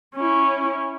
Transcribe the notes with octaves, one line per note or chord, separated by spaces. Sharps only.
C#4 E4